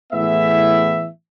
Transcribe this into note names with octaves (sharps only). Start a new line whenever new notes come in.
A2 E3 B3 G#4 E5